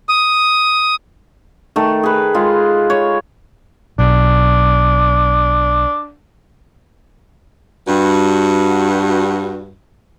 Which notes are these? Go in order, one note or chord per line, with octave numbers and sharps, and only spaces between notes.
D#6
D#3 A3
G#4 B4
G#3 F4
C#5
B1 D4
G2 F#4